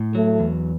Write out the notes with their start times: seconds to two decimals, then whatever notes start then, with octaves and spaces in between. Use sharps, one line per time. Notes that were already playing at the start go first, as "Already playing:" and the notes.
Already playing: A2
0.14 F#3 A3
0.40 E2